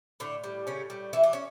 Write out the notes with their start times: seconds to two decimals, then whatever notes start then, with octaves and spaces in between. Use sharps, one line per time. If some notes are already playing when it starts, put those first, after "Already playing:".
0.20 A2 D3 D4
0.44 G3
0.67 A2 C#3 C#4
0.90 G3
1.13 E3 E4
1.23 D4
1.33 C#4